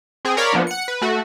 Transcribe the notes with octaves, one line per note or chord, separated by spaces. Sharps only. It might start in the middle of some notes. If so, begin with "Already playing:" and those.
C4 G#4
A#4 C#5 D5 F5 B5
F3 A#3 B3 D4
F#5 C#7
B4
A3 F#4